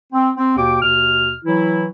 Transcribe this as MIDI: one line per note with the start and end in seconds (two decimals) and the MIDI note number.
0.13 0.30 60
0.37 0.56 60
0.57 0.82 39
0.57 0.82 47
0.57 0.82 79
0.57 0.82 86
0.82 1.34 39
0.82 1.34 47
0.82 1.34 89
1.45 1.87 52
1.45 1.87 54
1.45 1.87 64